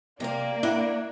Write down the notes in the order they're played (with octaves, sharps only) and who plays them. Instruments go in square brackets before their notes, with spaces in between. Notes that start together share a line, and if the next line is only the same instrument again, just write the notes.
[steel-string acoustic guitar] C3 F5 [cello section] A#3 [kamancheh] D5
[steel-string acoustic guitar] D4 [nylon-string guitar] E4 F#5